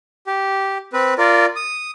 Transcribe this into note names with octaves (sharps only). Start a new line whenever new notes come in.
G4
C4 B4
F4 A#4 D5
D#6